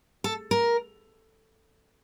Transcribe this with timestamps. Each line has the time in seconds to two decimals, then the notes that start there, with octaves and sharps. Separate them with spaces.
0.24 A4
0.51 A#4